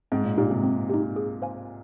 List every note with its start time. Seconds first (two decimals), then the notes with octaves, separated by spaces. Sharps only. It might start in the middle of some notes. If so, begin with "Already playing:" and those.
0.12 G#2 C4
0.24 A#2
0.37 A#2 D#4 G4
0.51 G#2 C3
0.64 C4
0.90 D#4 G4
1.16 G#4
1.42 C5 F5 G#5